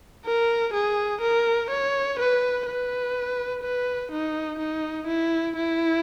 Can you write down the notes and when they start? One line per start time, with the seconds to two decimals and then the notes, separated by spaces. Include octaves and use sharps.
0.26 A#4
0.73 G#4
1.21 A#4
1.70 C#5
2.19 B4
2.67 B4
3.63 B4
4.11 D#4
4.59 D#4
5.07 E4
5.56 E4